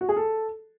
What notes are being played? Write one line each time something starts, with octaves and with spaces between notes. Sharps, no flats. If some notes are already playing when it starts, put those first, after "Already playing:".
F#4
G#4
A4